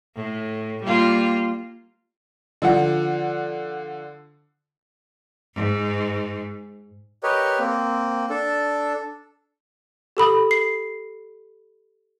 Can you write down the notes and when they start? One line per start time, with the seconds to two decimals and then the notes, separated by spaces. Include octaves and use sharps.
0.16 A2
0.83 G3 A#3 F4
2.62 D3 F3 F#5
5.54 G#2
7.23 G4 A#4 B4 C#5 D#5
7.59 A#3 C4
8.30 D4 A4
10.17 G4 A4 B5 D#6
10.51 C7